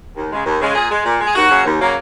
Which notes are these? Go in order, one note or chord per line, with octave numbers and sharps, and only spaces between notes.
D#2
C#3 G#3
D#2
C#3 G#3
A#2 G#4
G#3
A#2
G#3
G#4
D#2 F#4
C#3 F#3 A#3
D#2
C#3 F#3 A#3